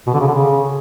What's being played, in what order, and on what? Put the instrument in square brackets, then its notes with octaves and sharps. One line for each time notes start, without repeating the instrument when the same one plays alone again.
[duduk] B2
D3
C#3
D3
C#3